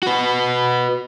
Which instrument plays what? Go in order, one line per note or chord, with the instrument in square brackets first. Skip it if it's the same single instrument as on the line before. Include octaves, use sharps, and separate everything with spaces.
[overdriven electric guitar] F#4 B4